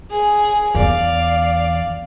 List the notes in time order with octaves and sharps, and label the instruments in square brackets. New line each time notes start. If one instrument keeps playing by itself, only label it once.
[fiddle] G#4
[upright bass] E2 [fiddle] D5 F5